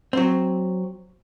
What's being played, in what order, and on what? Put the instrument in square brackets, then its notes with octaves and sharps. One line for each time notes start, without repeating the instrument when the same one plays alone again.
[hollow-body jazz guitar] F#3 C4